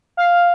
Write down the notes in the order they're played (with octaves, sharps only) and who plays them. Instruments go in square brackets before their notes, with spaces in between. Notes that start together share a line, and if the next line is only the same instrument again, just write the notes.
[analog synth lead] F5